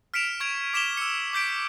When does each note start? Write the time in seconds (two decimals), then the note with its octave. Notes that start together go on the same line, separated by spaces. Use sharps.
0.14 F6 B6 C#7 D7 E7 F7
0.40 C#6 G#6 D7 F7
0.73 D6 B6 E7 F7 G7
0.97 E6 C#7
1.33 D6 G6 B6 D7